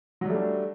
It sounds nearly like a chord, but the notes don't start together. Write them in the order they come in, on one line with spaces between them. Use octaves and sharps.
F#3 G3 A3 D4